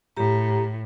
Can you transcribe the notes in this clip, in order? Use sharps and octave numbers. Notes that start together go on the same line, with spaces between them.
A2 G4 A#5